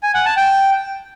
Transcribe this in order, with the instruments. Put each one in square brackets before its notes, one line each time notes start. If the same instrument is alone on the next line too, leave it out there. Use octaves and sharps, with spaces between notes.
[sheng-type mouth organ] G#5
F#5
A5
G5